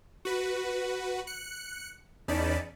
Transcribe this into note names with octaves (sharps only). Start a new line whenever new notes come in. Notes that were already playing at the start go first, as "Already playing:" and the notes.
F#4 B4
F#6 C#7
E2 C#4 D#4 D5 A5 B5